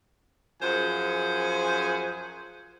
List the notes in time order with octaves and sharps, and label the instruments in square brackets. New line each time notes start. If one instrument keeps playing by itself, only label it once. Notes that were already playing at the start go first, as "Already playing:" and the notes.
[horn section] F#2 F3 G#4 C5 F#5 G#5